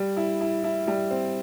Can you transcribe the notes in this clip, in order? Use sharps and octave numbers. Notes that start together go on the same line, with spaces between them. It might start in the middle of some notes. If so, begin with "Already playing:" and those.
Already playing: G3
E4
E4
E4
G3
C4